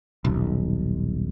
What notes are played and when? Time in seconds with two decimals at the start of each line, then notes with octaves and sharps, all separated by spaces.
0.25 D#1 B1